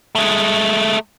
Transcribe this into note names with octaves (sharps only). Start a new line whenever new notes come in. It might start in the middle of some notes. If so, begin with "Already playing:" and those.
G#3 A3